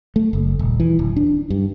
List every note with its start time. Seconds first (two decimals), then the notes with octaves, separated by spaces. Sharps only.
0.16 A3
0.33 F#1
0.59 D#1
0.80 E3
0.99 D1
1.16 D4
1.50 G2